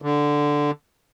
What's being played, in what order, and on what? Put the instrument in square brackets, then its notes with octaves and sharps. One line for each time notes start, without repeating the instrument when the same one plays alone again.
[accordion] D3